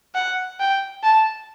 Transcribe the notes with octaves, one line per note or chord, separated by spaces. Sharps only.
F#5
G5
A5